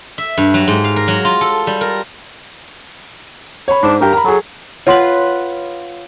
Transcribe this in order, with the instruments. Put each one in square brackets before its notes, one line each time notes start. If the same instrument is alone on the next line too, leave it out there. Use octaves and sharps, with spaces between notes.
[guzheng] E5
G2
F#3
G#2
F5
A#4
F#3
F4
A4
G3
A#4
[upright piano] C#5 B5
[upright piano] G#2 C5 [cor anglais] D4
[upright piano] G2 G4 G5 [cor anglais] A#4
[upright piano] A#5 B5
[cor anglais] F#3 [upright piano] G#4 A4
[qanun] F4 B4 [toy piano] C#5 F#5 C6